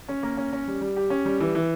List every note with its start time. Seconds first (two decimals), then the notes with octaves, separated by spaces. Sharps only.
0.08 C#4
0.23 A#3
0.37 C#4
0.53 C#4
0.67 G3
0.81 G3
0.96 G4
1.10 C#4
1.25 G3
1.40 E3
1.55 E3